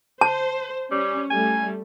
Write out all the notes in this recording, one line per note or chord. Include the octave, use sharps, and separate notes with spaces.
C5 A5
G3 C#4
G3 A3 G#5